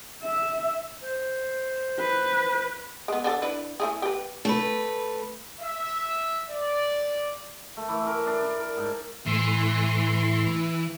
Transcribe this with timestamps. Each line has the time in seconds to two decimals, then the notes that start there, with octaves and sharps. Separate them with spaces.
0.23 E5
1.02 C5
1.99 B4
3.08 G#3 B3
3.24 D3 A4
3.42 D4 E4 B4
3.80 A3 E4 G#4
4.02 G4 B4
4.45 A3 B4
5.61 E5
6.50 D5
7.77 A3
7.88 E3
8.07 A#4
8.26 D4
8.42 D4
8.58 A#4
8.77 G#2
9.26 A2 E3 C6